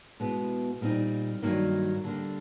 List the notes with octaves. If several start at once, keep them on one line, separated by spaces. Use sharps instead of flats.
B2 G#3 B3 E4
A#2 G3 C4 D#4
G2 D#3 F#3 A#3 D#4
D3 G3 A#3 D4